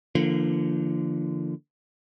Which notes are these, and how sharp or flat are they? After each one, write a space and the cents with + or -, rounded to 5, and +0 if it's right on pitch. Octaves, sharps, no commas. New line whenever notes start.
D3 +0 F3 -40 A#3 +0